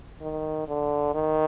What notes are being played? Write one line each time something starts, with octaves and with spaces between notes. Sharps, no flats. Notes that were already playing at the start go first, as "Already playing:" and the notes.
D#3
D3
D#3